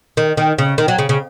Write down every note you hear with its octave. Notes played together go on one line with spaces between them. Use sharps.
D#3
D#3
C#3
D#3
F#3
C#3
C#3